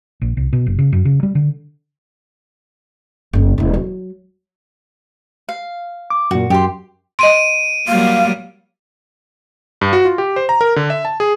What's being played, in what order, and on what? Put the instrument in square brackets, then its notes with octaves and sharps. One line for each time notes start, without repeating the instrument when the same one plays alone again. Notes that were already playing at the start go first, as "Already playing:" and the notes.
[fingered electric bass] A#1
C2
B2
F#1
C#3
F#2
C#3
G3
D3
[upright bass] F#1 C#4
D#1 E4
F#3
[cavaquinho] F5
[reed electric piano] D6
[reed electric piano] F#2 A#2 [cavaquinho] F#4
[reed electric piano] F#2 [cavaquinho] G4 C6
[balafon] D#5 C6 [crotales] D7 D#7
[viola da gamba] F#3 G3 A#3 [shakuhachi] F5
[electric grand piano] G2
F#4
F4
G4
C5
A#5
A#4
D3
E5
A5
G#4